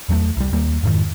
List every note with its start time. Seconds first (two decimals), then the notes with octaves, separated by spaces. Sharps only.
0.09 E2 F#3 G#3 A3
0.37 C2 G3
0.53 D#2 G3 A#3
0.83 F2 G#2 D#3